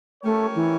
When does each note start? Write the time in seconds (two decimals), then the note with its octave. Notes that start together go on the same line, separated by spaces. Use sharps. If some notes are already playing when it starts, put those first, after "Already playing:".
0.23 F3 A3 C#4 G4 A#4 C#5
0.55 E3